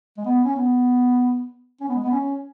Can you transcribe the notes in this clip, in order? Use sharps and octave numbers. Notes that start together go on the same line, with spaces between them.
G#3
B3
C#4
B3
C#4
B3
G#3
B3
C#4